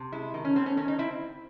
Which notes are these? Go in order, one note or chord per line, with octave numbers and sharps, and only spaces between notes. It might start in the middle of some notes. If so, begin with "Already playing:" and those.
Already playing: C3
G#3 E4
D#3
C#4
A3 C4
C#4
D#3 C#4
D#4
C4 E4